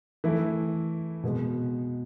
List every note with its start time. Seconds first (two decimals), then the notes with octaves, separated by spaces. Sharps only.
0.24 E3 A3 E4
1.23 B2 G#3 B3